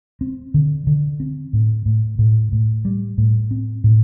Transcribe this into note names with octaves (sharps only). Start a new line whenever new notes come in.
C4
D3
D3
C4
A2
A2
A2
A2
G3
A2
C4
A2